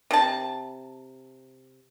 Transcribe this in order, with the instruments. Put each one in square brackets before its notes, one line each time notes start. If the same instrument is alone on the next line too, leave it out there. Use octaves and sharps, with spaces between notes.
[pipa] C3 A5